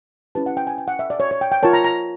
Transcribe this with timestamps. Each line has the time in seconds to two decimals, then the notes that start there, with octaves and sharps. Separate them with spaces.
0.35 C#4 E4 G4 B4 A5
0.46 F#5
0.57 G5
0.67 G#5
0.78 G5
0.88 F#5
0.99 E5
1.10 D5
1.20 C#5
1.31 C#5
1.41 G5
1.52 G5
1.63 F4 A#4 C#5 A5
1.73 A#5
1.84 A#5